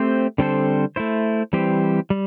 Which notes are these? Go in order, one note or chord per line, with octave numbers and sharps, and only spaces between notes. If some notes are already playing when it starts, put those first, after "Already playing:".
Already playing: A3 C4 G4 C5
D3 G3 C4 A4 C5
A3 E4 C5
E3 G3 C4 G4 C5
G3